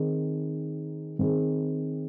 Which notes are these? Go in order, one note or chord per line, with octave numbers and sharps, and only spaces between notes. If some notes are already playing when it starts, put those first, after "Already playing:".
Already playing: D#3 C4 D#4 G#4
D#3 C4 G#4